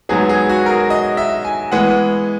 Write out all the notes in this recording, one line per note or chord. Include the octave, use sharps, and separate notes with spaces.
G#2 F#3 B3 G#4
G#4
F#4
A#4
G#4
D#5
E5
G#5
E3 G#3 B3 F#5